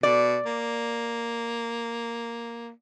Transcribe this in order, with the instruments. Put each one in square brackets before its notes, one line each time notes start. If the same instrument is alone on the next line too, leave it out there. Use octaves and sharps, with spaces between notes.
[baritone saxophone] B2 [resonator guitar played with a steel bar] D5
[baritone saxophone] A#3